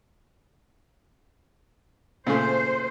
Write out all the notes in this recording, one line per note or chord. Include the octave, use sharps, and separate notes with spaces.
A#2 C#3 A3 C5